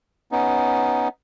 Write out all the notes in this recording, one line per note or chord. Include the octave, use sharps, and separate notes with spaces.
B3 C#4 D#4